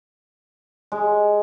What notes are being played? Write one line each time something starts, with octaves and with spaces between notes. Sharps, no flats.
G#3